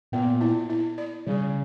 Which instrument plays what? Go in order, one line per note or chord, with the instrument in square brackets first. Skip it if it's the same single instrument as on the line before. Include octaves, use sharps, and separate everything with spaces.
[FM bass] A#2 [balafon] B3
[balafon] E4
E4
D5
[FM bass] C#3 [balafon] G3